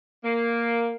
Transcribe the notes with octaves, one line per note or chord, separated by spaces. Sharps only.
A#3